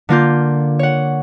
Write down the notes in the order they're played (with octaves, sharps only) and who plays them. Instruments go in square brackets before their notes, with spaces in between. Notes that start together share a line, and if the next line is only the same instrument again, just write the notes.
[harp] D3 A#3 F4 G6
C#5 F#5